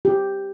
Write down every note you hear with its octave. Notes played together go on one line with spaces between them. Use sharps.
G4